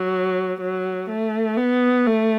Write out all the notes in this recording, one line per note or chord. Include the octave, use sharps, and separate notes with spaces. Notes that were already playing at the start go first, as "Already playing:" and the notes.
Already playing: F#3
F#3
A3
B3
A3